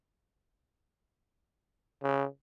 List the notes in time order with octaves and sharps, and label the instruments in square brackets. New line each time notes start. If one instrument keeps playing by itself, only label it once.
[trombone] C#3